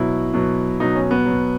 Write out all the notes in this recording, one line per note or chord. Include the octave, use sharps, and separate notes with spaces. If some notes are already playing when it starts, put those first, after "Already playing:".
Already playing: B2 F#3 E4
B2 F#3
B2 F#3 D#4
C#4
B3
B2 F#3